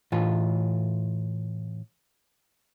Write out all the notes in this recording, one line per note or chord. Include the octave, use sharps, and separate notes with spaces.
A2 E3 F4